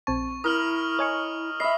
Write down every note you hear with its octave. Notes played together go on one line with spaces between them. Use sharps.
A#1 C4 A5 C#6
E4 A#4 D#6 F6 F#7
C#5 D#5 G#5 C#6
D#5 E5 B5 C7